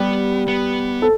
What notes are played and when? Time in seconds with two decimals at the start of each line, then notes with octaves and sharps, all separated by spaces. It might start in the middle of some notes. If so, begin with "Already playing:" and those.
Already playing: G3 B3 G4
0.47 B3
1.02 A4